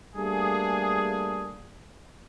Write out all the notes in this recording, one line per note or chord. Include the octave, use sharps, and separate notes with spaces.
G3 A3 A#3 D4 G#4